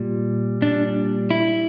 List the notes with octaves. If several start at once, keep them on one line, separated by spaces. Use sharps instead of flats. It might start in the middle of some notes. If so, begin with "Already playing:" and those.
Already playing: A#2 G3
A#2 G3 D4
E4